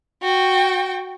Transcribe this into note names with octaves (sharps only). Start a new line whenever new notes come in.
F#4 G5